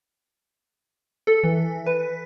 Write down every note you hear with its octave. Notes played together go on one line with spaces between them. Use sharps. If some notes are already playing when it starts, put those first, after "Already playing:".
A4
E3
B4